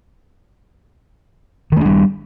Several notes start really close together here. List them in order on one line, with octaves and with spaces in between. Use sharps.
D#3 A3 D4 G3